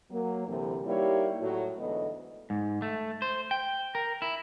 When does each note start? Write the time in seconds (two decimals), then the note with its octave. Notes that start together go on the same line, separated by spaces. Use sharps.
0.11 F#3 A#3
0.47 D2 C3 E3
0.84 G3 A#3 D#4 E4 G4 C#5
1.41 A2 F#3
1.78 D2 G#2 E3 B3 A4 D#5
2.50 G#2
2.82 A3
3.22 C5
3.51 G5
3.95 A#4
4.22 E4